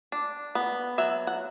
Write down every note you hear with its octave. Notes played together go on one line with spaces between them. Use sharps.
D4
B3
F#3 E5
F#5